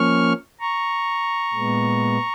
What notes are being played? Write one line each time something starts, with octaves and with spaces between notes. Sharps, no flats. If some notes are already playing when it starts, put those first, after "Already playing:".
Already playing: F3 A#3 C#4 C#6 F6
A#5 C#6
A#2 G#3 B3